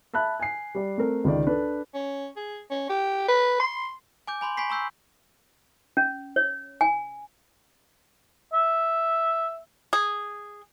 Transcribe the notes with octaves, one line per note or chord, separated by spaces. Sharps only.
E5 A5 B5 F#6
G#5 C7
G3 D5
A3 C4 A#4
C#2 D#3 D5
D4 A4 B4
C#4
G#4
C#4
G4
B4
C6
G#5 D6 G6
G#5 B5 C6 F#7
G#5 B5 C#6 B6 C7
A#5 C#6 E6 G6 C7
C#4
C#5
G#5
E5
G#4